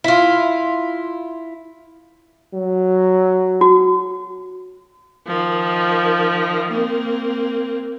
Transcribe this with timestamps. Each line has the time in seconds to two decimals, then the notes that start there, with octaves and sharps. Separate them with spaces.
0.04 E4 F4
2.54 F#3
3.61 F#4
5.27 D#3 F3
6.71 A#3 C4